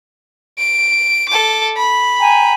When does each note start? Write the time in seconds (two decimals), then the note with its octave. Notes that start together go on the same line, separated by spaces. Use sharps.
0.58 D7
1.29 A4 D6
1.77 B5
2.20 G5 G#5 A#5